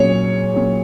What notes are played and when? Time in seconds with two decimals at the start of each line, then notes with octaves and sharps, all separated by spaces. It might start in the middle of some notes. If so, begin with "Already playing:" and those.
Already playing: A#2 F#3 C#4 G#4 C#5
0.54 A#2 F#3 C#4 G#4